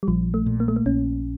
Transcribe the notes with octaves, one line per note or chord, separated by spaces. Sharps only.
G3
A#1 F3
A3
A#2
A#3
A3
A#3
A#1 C#4